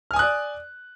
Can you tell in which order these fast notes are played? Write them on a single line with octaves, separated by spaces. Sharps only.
F6 G#5 D#6 F#6 D5